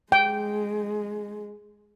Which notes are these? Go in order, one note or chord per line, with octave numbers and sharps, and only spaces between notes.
G#3 G5